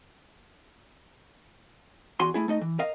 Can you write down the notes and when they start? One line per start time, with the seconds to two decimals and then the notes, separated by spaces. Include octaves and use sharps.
2.20 E2 F#4 G#5 C6
2.34 A3 E4 G#4
2.48 A3 D#4 D#5
2.61 E3
2.79 A#4 D#5 F5